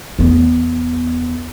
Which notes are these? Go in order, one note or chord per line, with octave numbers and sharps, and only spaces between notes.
E2 B3